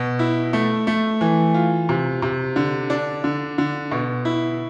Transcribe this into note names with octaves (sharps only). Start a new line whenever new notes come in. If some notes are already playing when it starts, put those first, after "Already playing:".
Already playing: B2
E4
A3
A3
E3
F4
C3
C3
D3
D4
D3
D3
B2
E4